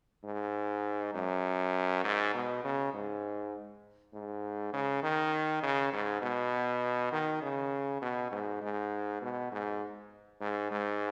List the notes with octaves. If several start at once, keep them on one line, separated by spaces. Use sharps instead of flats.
G#2
F#2
G#2
B2
C#3
G#2
G#2
C#3
D#3
C#3
G#2
B2
D#3
C#3
B2
G#2
G#2
B2
G#2
G#2
G#2